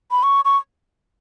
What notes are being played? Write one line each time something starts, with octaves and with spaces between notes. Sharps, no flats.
B5
C#6
C#6